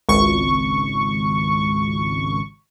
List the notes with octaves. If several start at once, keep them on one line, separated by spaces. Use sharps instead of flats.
G#1 C#2 C#6